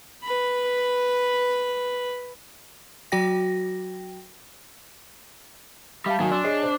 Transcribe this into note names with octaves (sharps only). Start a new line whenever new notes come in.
B4 B5
F#3 F#4 G5 A#6
G3 E5 F5 A5
D#3 F#3 G#5
D4 C6 E6
G#4 C#5 D#5 C7
C5